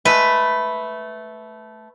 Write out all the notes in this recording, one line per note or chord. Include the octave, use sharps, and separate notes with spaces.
G#3 A3 B4